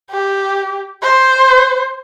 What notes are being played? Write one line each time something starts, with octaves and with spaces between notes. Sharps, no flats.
G4
C5